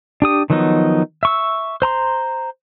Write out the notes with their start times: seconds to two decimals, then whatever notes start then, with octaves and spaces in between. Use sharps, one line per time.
0.22 D4 G4 D#6
0.50 D#3 F3 F#3 B3 D#4
1.23 E5 C#6 E6
1.82 C5 A#5 C6